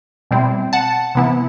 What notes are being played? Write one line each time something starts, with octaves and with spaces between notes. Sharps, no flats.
B2 G3 C4 E4
F#5 A5
C3 E3 B3 E4